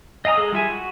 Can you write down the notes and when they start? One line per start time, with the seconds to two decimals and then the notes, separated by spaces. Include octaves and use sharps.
0.25 D#5 F5 G#5 A#5 D#6
0.37 G#3 G#4 A4
0.52 G3 F4 E5 G#5
0.70 F#4